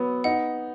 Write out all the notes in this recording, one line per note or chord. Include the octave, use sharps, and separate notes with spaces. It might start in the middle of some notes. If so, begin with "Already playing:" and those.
Already playing: F#3 B3
D#4 F#5